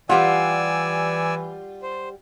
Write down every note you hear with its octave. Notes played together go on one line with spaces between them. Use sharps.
E3 G3 F4 G4 D5 F#5 G#5 E6
C5